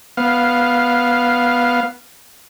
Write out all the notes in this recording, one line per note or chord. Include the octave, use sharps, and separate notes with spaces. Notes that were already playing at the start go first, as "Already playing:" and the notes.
B3 F5